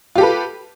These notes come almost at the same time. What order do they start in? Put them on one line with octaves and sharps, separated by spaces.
F4 G4 A4 B4